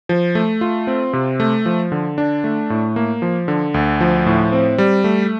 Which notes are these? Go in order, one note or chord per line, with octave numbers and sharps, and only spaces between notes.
F3
A3
F4
C4
C3
A3
F3
D3
D4
A3
A2
A#3
F3
D3
D2
F3
A2
C4
G3
A3